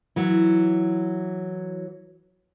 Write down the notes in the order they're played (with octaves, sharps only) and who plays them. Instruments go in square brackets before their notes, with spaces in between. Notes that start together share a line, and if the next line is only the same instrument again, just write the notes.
[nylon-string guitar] E3 F#3